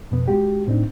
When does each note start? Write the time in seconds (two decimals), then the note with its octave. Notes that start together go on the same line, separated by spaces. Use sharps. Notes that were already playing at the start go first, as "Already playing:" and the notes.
0.11 F2 B2 B3
0.28 G#3 F#4 G4
0.67 A2 C4 D4 D#4